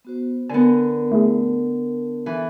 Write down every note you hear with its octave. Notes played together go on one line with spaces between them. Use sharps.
B3 F#4 C5
D3 B3 A#4 G#5
A3 E4 G#4
E3 A4 E5